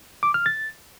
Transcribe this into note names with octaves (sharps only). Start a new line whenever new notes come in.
D6
F6
A6